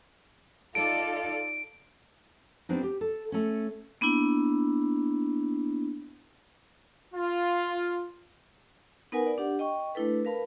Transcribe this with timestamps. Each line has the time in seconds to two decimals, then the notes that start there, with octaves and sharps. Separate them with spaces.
0.75 D#4 F4 A4 D5 D7
2.69 G3 B3 C4 D4 D#4
2.83 G4
3.01 A4
3.32 A3 C#4
4.01 A#3 B3 D4 E4
7.14 F4
9.12 B3 D#4 A#4 B4 F#5 G#5
9.26 D5
9.38 D4 G4 F#5
9.59 D#5 G5 C#6
9.95 A3 D4 E4 A4 B4
10.25 A#4 B4 F5 A5 B5